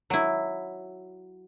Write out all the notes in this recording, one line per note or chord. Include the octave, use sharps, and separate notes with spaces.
F#3 E4